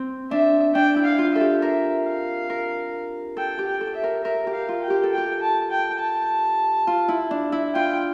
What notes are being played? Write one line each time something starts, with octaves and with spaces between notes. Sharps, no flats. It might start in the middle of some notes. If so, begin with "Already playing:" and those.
Already playing: C4
D4 E5
D4 G5
E4
F5
F4
A4 E5
G4
A#4 E5
F5
A#4
A4 G5
G4
G5
A4
E5
A#4
A#4 E5
G4
F5
F4
G5
G4
A4
G5
G4
A5
G5
A5
F4
E4
D4
E4
F4 G5